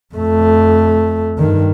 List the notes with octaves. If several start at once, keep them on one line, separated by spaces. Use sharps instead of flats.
F2 A3
G2 D#3